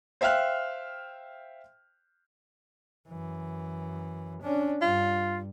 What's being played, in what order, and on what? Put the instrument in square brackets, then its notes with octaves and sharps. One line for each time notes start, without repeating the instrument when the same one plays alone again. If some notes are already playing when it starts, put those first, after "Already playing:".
[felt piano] C5 E5 F5 G5 F6 F#6
[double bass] F#2 E3
C#4 D4
[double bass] G2 [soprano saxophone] F4